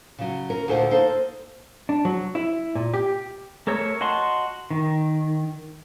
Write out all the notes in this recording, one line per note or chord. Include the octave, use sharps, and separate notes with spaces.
C#3 F#3
C#4 A#4
D2 A#2 A4 C5
A#3 D#4 A4 C5
D4
F#3
E4
A#2
G4
A3 A4 A#4 C#5 E6
F#4 D#5 A5 C6
D#3